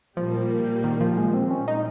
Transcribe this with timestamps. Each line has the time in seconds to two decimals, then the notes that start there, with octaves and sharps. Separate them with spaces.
0.17 A#2 F3 G3 A#3
0.84 D#3
1.01 F3
1.17 G#3
1.34 C4
1.51 A#2 G3 C4 C#4
1.68 D#4